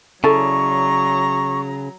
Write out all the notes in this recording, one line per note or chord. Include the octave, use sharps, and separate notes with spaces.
C#3 F#3 E4 A4 D5 A#5 C#6